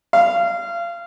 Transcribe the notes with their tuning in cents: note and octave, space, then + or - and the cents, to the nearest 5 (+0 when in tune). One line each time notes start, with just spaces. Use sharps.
F5 -30